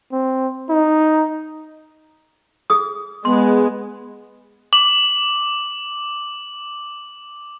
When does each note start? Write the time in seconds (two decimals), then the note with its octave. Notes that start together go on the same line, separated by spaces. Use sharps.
0.12 C4
0.70 D#4
2.70 G#4 D#6
3.25 G#3 B3 C6
4.73 D6 F#7